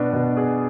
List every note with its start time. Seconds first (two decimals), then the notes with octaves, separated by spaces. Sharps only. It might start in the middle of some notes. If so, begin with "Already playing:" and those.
Already playing: B2 B3 D4
0.13 B2
0.37 G#4